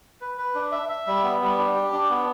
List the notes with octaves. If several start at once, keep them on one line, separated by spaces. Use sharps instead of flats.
B4
B4
D4
E5
E5
G3
B3
G3
D4
G4
D4
B3